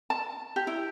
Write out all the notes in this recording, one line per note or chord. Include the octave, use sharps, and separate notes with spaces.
A5
G4
E4